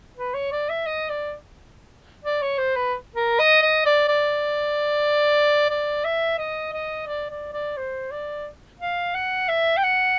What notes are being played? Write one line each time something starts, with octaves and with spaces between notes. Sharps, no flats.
B4
C#5
D5
E5
D#5
D5
D5
C#5
C5
B4
A#4
D#5
D#5
D5
D5
D5
E5
D#5
D#5
D5
D5
D5
C5
D5
F5
F#5
E5
G5
F#5